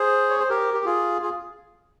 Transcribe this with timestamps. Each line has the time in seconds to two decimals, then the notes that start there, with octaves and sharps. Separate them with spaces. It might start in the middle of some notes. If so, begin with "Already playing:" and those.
Already playing: G#4 C5
0.30 C#5
0.40 C5
0.50 G4 A#4
0.74 G4
0.85 F4 G#4
1.22 F4 G#4